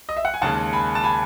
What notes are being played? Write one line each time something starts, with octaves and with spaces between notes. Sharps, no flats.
D#5
E5
F#5
G#5
D#2 C#3 G#3 F#5 A5
G#5 B5
A5
G#5 B5